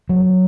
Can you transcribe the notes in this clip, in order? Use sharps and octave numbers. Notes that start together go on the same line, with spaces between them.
F#3